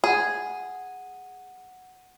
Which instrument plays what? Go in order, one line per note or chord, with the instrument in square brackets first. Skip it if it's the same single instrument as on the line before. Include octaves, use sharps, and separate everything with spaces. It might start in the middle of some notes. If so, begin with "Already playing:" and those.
[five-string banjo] G#4 [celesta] F#5 D#7